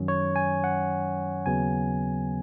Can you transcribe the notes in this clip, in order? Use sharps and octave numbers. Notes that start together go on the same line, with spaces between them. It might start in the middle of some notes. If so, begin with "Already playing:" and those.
Already playing: F#2 D#3 F#3 C#4
C#5
G#5
F#5
D#2 C#3 F#3 B3 G#5